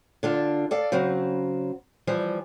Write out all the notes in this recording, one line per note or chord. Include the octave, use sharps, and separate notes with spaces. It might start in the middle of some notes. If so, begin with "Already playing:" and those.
D3 D4 F4
A4 D5 F5
C#3 F#3 C4
E3 F3 G3